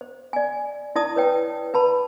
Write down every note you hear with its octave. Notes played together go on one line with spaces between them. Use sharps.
C5
D5 G#5
E4 D5 A5 D#6
B4 C#5 G5
B4 A5 B5